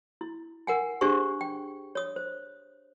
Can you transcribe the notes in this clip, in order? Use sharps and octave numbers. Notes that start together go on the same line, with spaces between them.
E4
A#4 F#5 G#5
D4 G4 G#4 C5 C#6
G5
C#5 D#6
C5